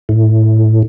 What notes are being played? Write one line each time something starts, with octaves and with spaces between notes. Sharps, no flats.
A2